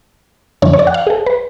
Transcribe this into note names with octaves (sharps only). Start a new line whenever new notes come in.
F#2 D3 F3 C#5
C#5
D5
F#5
F5
G#4
A4
B4